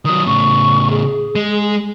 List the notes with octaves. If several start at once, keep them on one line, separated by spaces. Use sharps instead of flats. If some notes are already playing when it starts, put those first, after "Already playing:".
D#3 F#3 D#6
A2 C#3 C#6
G#4
G#3